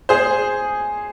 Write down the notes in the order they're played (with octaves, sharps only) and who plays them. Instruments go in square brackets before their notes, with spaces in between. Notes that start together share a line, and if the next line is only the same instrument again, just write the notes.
[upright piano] G#4 C5